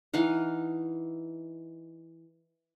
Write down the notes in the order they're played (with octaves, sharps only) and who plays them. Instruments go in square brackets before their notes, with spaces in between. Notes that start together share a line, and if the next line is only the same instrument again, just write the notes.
[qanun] E3 D#4 F5 F#5